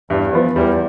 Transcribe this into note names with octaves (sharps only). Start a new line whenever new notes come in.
E2 G2
F3 B3
E2 G3